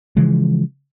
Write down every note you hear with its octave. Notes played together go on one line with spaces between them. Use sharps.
C#3 E3 F3 G#3